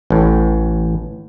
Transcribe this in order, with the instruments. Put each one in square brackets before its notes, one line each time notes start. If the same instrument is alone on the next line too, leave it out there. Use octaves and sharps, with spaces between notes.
[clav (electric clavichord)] A1 A2